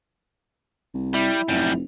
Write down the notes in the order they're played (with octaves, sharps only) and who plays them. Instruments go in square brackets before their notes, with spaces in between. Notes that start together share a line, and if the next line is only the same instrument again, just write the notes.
[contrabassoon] C2
[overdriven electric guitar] G3 [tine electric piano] E4
[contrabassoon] F1 [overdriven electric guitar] F#2 G3